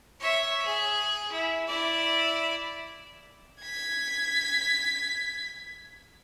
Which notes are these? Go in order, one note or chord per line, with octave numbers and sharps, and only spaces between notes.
C#5 E5
G#4
E4
E4 D5
G#6 B6